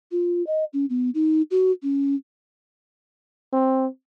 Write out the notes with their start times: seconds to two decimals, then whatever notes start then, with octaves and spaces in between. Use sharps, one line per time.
0.12 F4
0.47 D#5
0.73 C#4
0.90 B3
1.15 D#4
1.51 F#4
1.83 C#4
3.53 C4